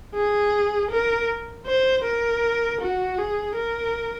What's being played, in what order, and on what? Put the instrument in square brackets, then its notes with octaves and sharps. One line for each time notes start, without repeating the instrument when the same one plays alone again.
[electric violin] G#4
A#4
C5
A#4
F#4
G#4
A#4